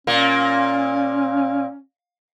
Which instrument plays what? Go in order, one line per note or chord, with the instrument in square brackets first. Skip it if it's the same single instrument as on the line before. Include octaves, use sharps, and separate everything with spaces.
[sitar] A#2 A#3 [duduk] C#4